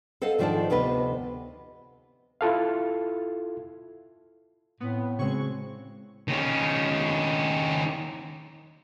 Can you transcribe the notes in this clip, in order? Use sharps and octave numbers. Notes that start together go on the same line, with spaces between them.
A4 C5 D#5 F5 F#5
G#2 D#3 F3 D4 D5 A5
D2 C3 B3 B4 D#5
E4 F4 A4 F5
A2 B3 C4
C#3 G#3 C4 F#4 G#4 C#6
D#3 C#4